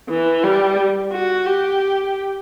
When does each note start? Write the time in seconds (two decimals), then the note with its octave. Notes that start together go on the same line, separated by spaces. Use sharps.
0.10 E3
0.44 G3
1.13 F#4
1.46 G4